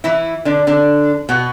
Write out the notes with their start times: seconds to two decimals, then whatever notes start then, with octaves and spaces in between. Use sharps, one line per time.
0.04 E3 E4
0.45 D3 D4
0.67 D3 D4
1.29 B2 B3